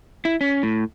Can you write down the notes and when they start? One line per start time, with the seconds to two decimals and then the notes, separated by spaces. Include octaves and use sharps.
0.25 E4
0.41 C#4
0.63 A2